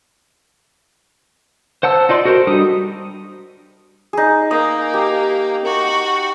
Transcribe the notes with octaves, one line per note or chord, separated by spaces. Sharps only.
C5 F#5 A5 E6
D#4 F4 D5 C6
F#4 A4 A#4 C5
G3 D4 D#4 D#6
D#4 G#4
A#3 D#5
G4
F#4